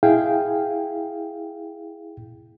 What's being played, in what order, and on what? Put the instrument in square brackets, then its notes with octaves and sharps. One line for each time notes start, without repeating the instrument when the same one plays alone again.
[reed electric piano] E4 G#4 F5 G5